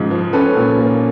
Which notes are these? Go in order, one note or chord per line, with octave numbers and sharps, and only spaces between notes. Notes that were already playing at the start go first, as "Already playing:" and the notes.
Already playing: G#2 C#3 F3
F3
C#4 A4 B4
A#2
A#3